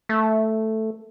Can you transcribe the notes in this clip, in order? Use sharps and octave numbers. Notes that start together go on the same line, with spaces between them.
A3